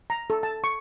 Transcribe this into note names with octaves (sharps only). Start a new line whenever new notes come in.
A#5
A4
A5
C#6